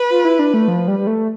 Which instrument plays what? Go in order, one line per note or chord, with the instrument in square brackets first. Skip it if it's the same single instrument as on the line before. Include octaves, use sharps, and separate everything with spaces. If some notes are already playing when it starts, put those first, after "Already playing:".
Already playing: [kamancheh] B4
[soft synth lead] F4
E4
D4
A3
F3
G3
G3
A3